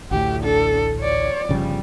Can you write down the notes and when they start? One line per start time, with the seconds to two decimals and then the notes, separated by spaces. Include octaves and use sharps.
0.11 A1 D2 A2 G4
0.42 D4 A4
1.01 C#5 D5
1.49 G1 C#3 F3 G3